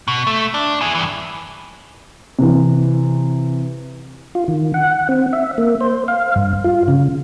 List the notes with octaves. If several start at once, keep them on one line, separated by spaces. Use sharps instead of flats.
B2
A3
D4
E4 G#4
G2 E3
C3 E3
F4
D#3
F#5
C4
E5
A#3
C5
F5
G2
F4
C#3